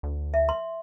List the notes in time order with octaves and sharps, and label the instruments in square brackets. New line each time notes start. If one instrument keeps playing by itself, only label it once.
[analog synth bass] D2
[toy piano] E5
C6